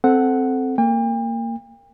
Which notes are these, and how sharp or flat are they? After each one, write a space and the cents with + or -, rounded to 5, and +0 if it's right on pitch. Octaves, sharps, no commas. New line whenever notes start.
C4 +0 A4 +0 F#5 +0
A#3 -20 G5 +40